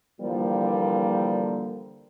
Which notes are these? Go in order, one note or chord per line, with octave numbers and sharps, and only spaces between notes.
D3 E3 F3 G3 A#3